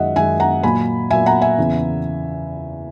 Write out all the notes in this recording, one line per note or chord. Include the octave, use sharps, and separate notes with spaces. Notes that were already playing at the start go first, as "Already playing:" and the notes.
Already playing: F#2 D#3 G#3 D#5 E5 F#5
F#2 D#3 G#3 E5 G#5
F#5 A#5
A#2 F#3 A#3 G#5 B5
A#2 F#3 A#3 E5 G#5
F#5 A#5
E5 G#5
E2 C#3 E3